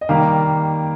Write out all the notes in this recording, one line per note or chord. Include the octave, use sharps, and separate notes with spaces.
D#5
D#3 G3 A#3 F5